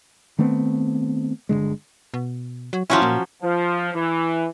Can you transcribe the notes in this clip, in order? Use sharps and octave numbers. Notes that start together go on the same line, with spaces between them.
D#3 A3 B3 C4
G1 C#2 D3 G#3
B2
F#3
F3 F#3 C#4 E4
A#2
F3
E3